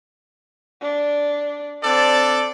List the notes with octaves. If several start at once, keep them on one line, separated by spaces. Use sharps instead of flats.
D4
C4 D4 A4 D5